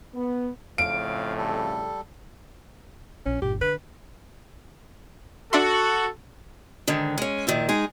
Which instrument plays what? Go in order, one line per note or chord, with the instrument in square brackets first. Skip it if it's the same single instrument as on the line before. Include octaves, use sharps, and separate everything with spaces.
[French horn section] B3
[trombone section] F2 A2 C#3 [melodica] F5 [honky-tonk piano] D7
[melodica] G3 A4
[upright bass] A#1 [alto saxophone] C#4
[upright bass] G1 A#2 [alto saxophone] G4
[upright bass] D3 [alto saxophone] B4
[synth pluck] D4 E5 C6 [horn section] F#4 [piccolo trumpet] A4
[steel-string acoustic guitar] G#2 D3 D#3
G#3 C#4
A#2 D#3 F3 E4
G#3 D#4 G#4